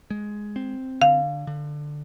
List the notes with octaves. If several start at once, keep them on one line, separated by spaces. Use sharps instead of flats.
G#3
C4
D3 F5
D3